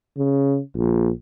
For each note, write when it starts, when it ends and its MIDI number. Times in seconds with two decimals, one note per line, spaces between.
0.17 0.59 49
0.76 1.10 34